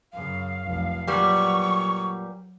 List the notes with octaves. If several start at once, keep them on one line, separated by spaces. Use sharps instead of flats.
F#2 C#3 F5
F1 B1
A#2 F#3 G3 B3 C#6